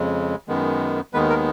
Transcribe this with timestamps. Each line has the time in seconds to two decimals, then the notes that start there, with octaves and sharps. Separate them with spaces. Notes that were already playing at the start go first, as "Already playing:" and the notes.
Already playing: F2 C#3 G#3
0.48 F#2 D#3 G#3 B3
1.13 D#2 D#3 G#3 B3 B4
1.30 A#4